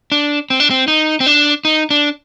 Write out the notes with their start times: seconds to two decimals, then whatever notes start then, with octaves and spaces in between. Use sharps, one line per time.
0.12 D4
0.50 C4
0.60 D4
0.70 C4
0.88 D#4
1.20 C4
1.26 D4
1.65 D#4
1.90 D4